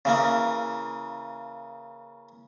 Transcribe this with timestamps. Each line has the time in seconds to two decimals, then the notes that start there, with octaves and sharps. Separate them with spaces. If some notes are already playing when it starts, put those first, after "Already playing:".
0.05 C#3 E3 A#3